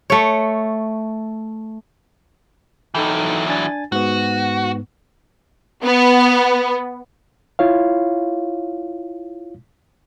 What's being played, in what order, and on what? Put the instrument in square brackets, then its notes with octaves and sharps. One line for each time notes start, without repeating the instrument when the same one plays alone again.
[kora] A3 C#5
[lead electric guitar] E3 F#3 [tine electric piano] D#4 A4 G5
[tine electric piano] D4 G#5 A6
[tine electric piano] G#2 B3 [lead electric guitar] F#4
[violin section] B3
[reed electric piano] E4 F4 C#5 F5